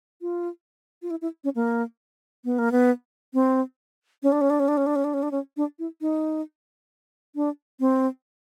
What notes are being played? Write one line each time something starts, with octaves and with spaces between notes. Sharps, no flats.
F4
F4
E4
E4
C#4
A#3
B3
A#3
B3
C4
C#4
D4
C#4
D4
C#4
D4
C#4
D4
C#4
D4
C#4
D4
C#4
D4
E4
D#4
D4
C4